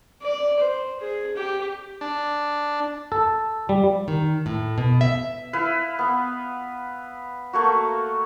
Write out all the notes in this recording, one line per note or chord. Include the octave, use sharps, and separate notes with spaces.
D5
C5
G#4
G4
D4
A4
G3
D#3
A2
B2
E5
E4 B4 E5 F5
B3 F5
A3 A#3 F#4